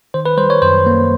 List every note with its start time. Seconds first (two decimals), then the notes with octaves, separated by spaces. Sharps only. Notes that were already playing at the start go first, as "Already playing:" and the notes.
0.14 D#3 C5
0.26 B4
0.37 G3 C5
0.50 C#5
0.62 F#2 C5
0.86 A#3